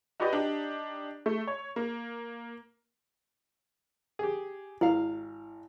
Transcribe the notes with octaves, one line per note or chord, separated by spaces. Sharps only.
D#4 F#4 G4 B4 D5 D#5
D4 D#4 G4
A3
C#5
A#3
G4 G#4
G#1 E4 F5